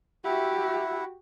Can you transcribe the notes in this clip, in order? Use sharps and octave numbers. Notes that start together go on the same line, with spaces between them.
E4 F#4 G4 E5 F#5